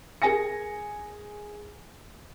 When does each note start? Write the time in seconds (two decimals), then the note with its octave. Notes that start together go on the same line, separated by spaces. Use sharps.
0.22 G#4 A#4 G#5 A#6 C#7